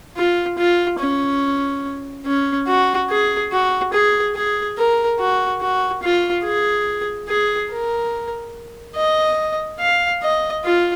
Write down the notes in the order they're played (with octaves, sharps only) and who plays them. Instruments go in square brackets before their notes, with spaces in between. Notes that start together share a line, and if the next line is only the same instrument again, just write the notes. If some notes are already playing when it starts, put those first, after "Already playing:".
[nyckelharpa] F4
F4
C#4
C#4
F#4
G#4
F#4
G#4
G#4
A#4
F#4
F#4
F4
G#4
G#4
A#4
D#5
F5
D#5
F4